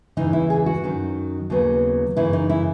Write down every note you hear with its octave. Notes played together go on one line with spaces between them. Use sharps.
E2 C#3 E3 D#4
E4
G#4
F#4
F#2 D#3 F#3 C#4
D#2 C#3 F#3 B3
F#2 C#3 E3 E4
D#4
E4